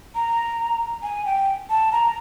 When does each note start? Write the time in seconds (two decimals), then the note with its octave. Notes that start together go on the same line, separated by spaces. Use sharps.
0.15 A#5
1.03 G#5
1.25 G5
1.70 A5
1.92 A#5